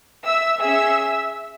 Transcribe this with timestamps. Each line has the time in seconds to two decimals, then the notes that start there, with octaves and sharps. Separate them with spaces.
0.25 E5 E6
0.60 C#4 G#4 E5 E6